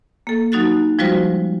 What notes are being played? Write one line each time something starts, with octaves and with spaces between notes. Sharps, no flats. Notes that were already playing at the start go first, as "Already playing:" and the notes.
A#3 A4
F#3 D#4 F#4 F#6 A6
F3 G3 G#3 F4 F#4 C5